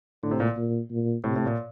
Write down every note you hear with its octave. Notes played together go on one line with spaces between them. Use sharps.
A2 D3
C3
A#2
A#2
A#2
A2 C3
A2
A#2